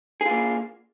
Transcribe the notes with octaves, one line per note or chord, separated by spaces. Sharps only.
A#3 F4 G#4